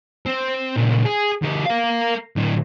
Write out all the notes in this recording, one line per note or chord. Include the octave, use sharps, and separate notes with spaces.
C4
A#2 C#3
G#4
D2 G4
A#4 F5
D2 A2